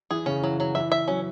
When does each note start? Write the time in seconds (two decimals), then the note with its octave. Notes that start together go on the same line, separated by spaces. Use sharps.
0.11 E3 G#4
0.26 C#3 C#4
0.42 E3 F#3
0.60 F#3
0.75 E3 E5
0.92 E5
1.08 F#3 C#4